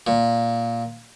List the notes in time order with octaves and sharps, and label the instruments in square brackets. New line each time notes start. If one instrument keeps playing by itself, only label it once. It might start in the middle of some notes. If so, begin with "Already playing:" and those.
[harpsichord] A#2